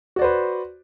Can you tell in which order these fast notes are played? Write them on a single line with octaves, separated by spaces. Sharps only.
F#4 D5 C5 B4